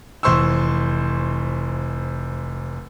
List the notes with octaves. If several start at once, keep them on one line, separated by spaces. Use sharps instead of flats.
F1 E3 C5 C6 C#6 E6